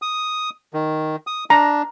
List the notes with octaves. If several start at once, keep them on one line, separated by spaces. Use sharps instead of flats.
D#6
D#3
D#6
D4 A#5